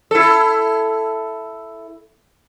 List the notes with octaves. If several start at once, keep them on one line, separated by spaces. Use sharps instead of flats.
E4 A4